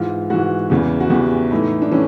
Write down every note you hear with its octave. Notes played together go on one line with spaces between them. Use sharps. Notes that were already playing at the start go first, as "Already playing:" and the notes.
Already playing: G#2 E3 F4
G#2 E3 F#4
E2 C#3 E3
F#4
E2 C#3 E3 G4
A2 E3 D#4
D4
A2 E3 C#4